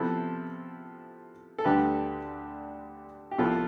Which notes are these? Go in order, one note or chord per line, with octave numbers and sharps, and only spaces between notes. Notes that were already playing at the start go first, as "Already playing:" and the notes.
Already playing: C3 F3 B3 E4 A4 C5
A4
D2 D3 G3 D4 G4 B4
G4
C2 C3 F3 B3 E4 F4 A4